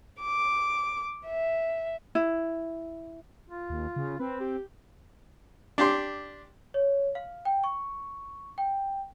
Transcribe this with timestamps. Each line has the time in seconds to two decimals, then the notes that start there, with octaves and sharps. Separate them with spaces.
0.21 D6
1.26 E5
2.15 E4
3.50 F4
3.70 D#2
3.96 C#3
4.20 C4 B4
4.40 G4
5.78 D4 G4 C6
6.74 C#5
7.15 F5
7.45 G5
7.64 C#6
8.58 G5